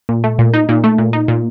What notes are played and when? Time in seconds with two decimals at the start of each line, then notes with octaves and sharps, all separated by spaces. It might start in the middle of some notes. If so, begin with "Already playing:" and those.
0.09 A#2
0.24 A3
0.39 A#2
0.54 D#4
0.69 A#2
0.84 A3
0.98 A#2
1.13 D#4
1.28 A#2